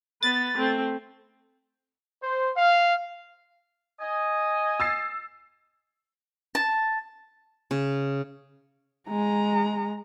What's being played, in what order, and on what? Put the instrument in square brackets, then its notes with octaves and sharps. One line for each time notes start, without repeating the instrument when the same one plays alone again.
[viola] B3 B4 [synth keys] A6
[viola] A3 C4
[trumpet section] C5
F5
[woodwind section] D#5 G#5
[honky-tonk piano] E6 A6 C7
[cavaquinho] A5
[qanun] C#3
[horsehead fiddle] G#3 A#5